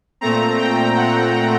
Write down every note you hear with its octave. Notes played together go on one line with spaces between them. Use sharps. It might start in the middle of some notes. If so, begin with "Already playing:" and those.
A#2 A3 C4 A#5
G5
F#5